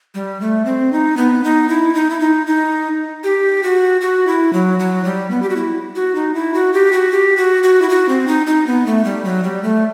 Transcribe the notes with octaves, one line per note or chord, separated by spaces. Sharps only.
G3
A3
C4
D#4
B3
D#4
E4
D#4
E4
D#4
D#4
G4
F#4
F#4
E4
F#3
F#3
G3
B3
G4
F#4
E4
F#4
D#4
E4
F#4
G4
F#4
G4
F#4
F#4
E4
F#4
C4
D#4
D#4
B3
A3
G3
F#3
G3
A3